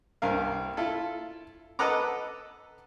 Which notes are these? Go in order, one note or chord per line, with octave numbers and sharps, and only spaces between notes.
C2 G2 A#4 F5
E4 F4 A4
A4 B4 D#5 F#5 A#5 D6